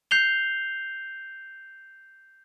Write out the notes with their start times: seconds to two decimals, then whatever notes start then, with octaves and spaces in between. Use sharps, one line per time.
0.11 G6 C7 F7 G7